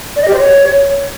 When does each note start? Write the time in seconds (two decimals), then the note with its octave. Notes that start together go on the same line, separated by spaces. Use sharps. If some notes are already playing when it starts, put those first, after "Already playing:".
0.16 D5
0.22 D#5
0.28 G4
0.33 C5
0.39 C#5